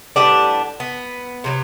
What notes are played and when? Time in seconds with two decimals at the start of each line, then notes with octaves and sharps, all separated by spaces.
0.16 A2 G3 B3 D4
0.80 B3
1.44 C3 F#3 B3